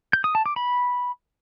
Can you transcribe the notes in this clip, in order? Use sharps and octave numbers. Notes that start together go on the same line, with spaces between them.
G6
D#6
A5
D6
B5